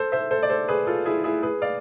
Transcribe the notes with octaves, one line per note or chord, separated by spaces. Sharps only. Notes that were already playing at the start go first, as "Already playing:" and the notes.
Already playing: A4 C5
C5 E5
A4 C5
D5
A4 C5
G#4 B4
F4 A4
E4 G#4
E4 G#4
G#4 B4
D5 F5